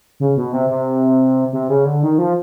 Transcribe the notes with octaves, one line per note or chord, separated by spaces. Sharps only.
C#3
B2
C3
C3
C3
C#3
D3
D#3
F3